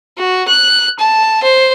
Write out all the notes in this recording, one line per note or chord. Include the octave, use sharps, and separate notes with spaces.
F#4
F#6
A5
C5